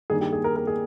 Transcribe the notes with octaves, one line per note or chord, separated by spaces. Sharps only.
G2 D#3 A#3 G#4
G4
G#4
A#4
A#4
G#4